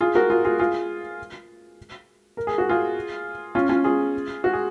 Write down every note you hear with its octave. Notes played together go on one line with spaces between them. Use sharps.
F4 G#4
F#4 A#4
F4 G#4
F4 G#4
F4 G#4
A#4
G#4
F#4
F4 G#4
C#4 F4
C#4 F4
F4 G#4
F#4
G#4